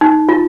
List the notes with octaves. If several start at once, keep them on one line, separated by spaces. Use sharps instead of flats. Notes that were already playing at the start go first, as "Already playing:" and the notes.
D#4
F4